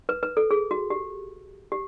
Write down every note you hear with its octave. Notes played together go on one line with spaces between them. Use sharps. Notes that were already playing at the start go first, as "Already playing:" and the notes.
B4
B4
A4
G#4
F#4
G4
G4